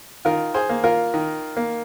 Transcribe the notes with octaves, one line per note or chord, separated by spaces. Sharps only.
D#3 F4 A#4
G#4 C5
A#3
F4 A#4
D#3
A#3